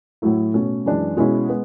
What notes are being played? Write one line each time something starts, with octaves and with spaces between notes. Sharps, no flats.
A2 F#3 A3 E4
B2 A3 C#4
F#2 E3 G#3 D4
B2 G#3 C#4 E4
G#3 B3